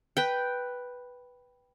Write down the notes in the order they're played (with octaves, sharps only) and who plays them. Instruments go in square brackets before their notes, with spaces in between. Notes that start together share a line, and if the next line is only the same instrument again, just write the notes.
[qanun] B4 G5